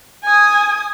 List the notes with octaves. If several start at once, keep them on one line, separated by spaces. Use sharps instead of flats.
G#5 D#6